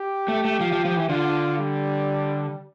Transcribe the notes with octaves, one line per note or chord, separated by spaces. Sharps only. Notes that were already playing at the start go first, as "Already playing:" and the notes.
Already playing: G4
A3
A3
F3
F3
F3
E3
D3 F4
G3